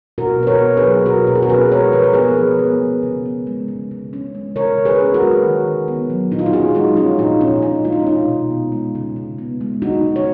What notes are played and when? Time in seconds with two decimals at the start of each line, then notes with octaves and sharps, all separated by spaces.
0.18 B2 F#4 A#4
0.40 B2 B4
0.47 A#4 C#5
0.62 B3
0.77 G#4 B4
0.83 F#3
1.06 B2 F#4 A#4
1.27 B2 A#4
1.35 G#4
1.42 F#4 A#4
1.49 C#4 G#4 B4
1.71 G#3 A#4 C#5
1.93 F3 B4
2.03 A#4
2.13 B3 G#4 B4
2.37 F3
2.59 B3
2.81 C#3
3.03 C#3
3.26 B3
3.47 G#3
3.68 C#3
3.91 C#3
4.13 C#4
4.35 G#3
4.56 C#3 A#4 C#5
4.78 C#3
4.85 G#4 B4
5.00 C#4
5.14 F#4 A#4
5.22 G#3
5.44 D#3
5.65 D#3
5.88 B3
6.10 F#3
6.31 A#2 D#4
6.39 F4
6.46 F#4
6.53 C#4 F4 G#4
6.75 G#3 D#4 F#4
6.97 F3 C#4 F4
7.19 A#2 D#4
7.41 A#2 C#4
7.62 C#4 D#4
7.85 G#3 F4
7.92 D#4
7.99 C#4
8.06 B2 D#4
8.28 B2
8.51 B3
8.72 G#3
8.95 C#3
9.16 C#3
9.38 B3
9.61 G#3
9.82 C#3 D#4 F#4
10.04 C#3
10.16 C#5